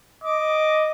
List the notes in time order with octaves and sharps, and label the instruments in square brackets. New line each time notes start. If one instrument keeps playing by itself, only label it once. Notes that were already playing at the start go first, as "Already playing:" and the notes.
[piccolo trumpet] D#5 [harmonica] D6